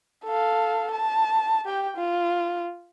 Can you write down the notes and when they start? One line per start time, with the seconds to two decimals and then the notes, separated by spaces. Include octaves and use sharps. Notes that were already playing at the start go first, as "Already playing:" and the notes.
0.25 A4 F5
0.92 A5
1.65 G4 G5
1.96 F4